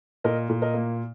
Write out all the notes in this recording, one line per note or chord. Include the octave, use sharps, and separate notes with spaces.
A#2 A#4 D#5
A#2
A#4 D#5
A#3